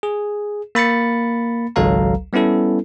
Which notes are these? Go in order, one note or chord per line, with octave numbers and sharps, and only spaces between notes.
G#4
A#3 B5 A6 C#7
G#1 C#2 F#3 A4 F5 A#5
G3 B3 C#4 E4 A4